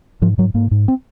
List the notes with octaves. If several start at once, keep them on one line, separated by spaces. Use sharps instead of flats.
G#2 F3
G#2 F#3
G#2 A#3
G#2
C4